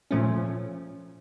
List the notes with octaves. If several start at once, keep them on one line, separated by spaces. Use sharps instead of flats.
A#2 F3 A3 C#4